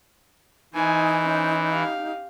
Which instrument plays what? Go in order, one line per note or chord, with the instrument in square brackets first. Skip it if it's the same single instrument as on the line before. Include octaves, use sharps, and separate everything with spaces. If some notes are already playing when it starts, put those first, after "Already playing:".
[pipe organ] E3 [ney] D#4 [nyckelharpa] C5 G#5
[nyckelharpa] C#4 C5
G4 F5